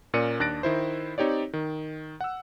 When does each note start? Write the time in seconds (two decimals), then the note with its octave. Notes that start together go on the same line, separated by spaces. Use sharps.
0.14 A#2 C#4 A#4 D5 C#7 D#7
0.40 D#2 D4 F#6 A6 A#6 D7
0.63 D#3 E4 C5
1.18 C4 D#4 G4 C#5 D5
1.53 D#3
2.21 F#5 E6